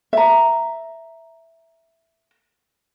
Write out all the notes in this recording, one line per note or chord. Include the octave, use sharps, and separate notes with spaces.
E5 A#5